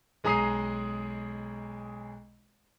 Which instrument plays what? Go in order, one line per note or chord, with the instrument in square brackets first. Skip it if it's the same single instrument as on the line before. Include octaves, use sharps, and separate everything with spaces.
[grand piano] B1 G#3 G#4 A#5 D#6 C7